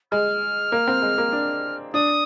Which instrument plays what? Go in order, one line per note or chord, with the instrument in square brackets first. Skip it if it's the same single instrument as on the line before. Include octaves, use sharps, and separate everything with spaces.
[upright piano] G#3 [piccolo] F6
[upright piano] A#3
C4
G#3
A#3
D4
[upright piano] D4 [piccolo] D#6